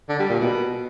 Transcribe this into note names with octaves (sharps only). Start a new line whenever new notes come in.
D3
G3
A#2
B2